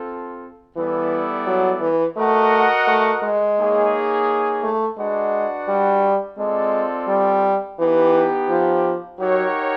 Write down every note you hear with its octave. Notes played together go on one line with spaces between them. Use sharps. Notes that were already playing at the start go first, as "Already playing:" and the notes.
Already playing: C4 F4 A4
E3 G3 B3 E4 A4 D5
F#3
E3
A3 F#4 A#4 D#5 F#5
A3
G#3
A#3 D#4 G#4 C#5
A3
G#3 D4 F#4 B4 D5 F#5
G3
G#3 C4 F4 A4 D5
G3
E3 B3 D#4 G4
F3
F#3 D#4 G4 A#4 C#5 F#5